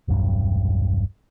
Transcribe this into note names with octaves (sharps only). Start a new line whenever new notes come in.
E1 C2 G2 F#3